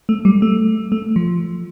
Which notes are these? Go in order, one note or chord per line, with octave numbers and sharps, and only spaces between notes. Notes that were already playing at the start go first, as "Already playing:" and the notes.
A3
G3
A3
A3
F3